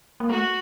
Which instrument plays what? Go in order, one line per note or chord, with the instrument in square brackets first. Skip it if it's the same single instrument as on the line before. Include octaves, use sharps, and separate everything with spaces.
[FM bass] A#3
[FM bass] A3 [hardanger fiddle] F#4